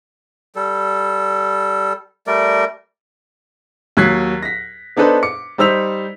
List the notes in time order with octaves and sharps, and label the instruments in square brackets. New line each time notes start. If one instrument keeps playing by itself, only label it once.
[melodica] G3 A4
G3 A3 A#4 D5
[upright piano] D#2 F#3 F#6 G#6 B6 C7
A#6 B6
B3 D4 D#4 A4 B4 C5
D6 C#7
G3 D#4 C5 E6 B6 F7